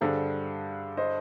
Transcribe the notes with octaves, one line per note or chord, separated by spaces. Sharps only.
G2 D3 G3 G#4 C5
C5 D#5